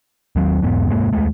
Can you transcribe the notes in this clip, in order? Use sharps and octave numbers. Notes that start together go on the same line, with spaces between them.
D#2 F#3 G#3 C4
E1 E2 G#2 B3
F1 G#2 G#3 A#3
D#2 G#3 A3